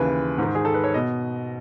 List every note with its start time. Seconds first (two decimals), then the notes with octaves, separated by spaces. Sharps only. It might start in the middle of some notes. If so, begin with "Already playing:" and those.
Already playing: D#2 C#3 E3 B4
0.38 G#2 D#3
0.55 G#4
0.65 A4
0.74 B4
0.84 C#5
0.94 B2 D#5